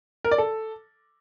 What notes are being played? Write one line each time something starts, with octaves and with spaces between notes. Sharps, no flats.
A#4
D5
A4